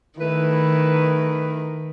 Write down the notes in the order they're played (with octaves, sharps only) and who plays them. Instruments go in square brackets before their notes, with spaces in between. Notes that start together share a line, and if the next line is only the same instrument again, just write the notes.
[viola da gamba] D#3 [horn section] A3 E4 B4